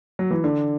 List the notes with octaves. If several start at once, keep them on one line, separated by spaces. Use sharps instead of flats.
F#3
E3
D3